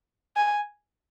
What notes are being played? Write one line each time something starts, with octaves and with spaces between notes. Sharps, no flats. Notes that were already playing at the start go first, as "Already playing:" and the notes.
G#5